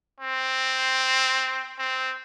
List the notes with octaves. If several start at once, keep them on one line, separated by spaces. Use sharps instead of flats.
C4
C4